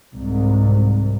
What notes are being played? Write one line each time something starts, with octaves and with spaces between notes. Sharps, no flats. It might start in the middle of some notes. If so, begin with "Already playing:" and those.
C2 G#2